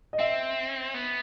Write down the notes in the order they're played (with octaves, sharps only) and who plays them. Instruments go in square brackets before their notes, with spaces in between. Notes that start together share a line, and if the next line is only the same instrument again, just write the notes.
[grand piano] D#5
[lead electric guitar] C4 [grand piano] E5
[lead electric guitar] B3